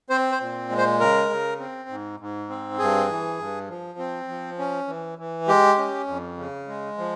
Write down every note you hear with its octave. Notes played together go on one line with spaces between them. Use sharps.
C4 C5
C5
A#2
G#3
C5
C#3 A#4
C#3
C4
G#2
G#2
C4
G2 G#4
E3
G2
F3
C4
F3
C#4
E3
E3
G#3 G4
C#4
F2
C#3
G#3
F3